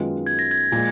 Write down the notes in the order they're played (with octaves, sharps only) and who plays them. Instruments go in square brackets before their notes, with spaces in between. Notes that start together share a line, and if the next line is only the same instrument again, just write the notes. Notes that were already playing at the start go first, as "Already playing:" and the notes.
Already playing: [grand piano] F#2 D#3 G#3 B3 F4
[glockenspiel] G#6
A#6
G#6
[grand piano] A#2 F3 G#3